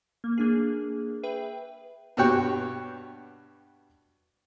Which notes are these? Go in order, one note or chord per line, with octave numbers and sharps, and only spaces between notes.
A#3
A#3 D4 G#4
G#4 B4 E5 G5
G2 B2 F#4 G4 C#5 G5